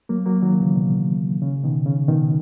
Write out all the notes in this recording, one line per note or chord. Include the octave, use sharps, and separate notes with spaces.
F#3 A#3
F#3 A#3
D#3 F#3
C#3 E3
B2
C#3
B2 D#3
C#3
B2 D#3